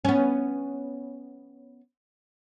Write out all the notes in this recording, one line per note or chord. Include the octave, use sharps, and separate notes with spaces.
B3 C#4